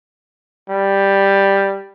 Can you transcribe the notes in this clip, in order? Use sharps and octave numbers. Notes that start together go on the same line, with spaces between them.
G3